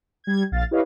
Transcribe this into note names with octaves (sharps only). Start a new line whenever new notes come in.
G3 G#6
A#1 F5 A6
E4 G4 B4 C#5 D#5 F5